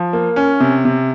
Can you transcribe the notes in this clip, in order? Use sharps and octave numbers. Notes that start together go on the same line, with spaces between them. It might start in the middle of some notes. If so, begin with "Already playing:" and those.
Already playing: F3
A#3
C#4
C3
C3